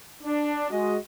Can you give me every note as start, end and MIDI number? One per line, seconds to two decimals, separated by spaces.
0.22 0.68 62
0.70 0.97 56
0.70 0.97 66
0.70 0.97 75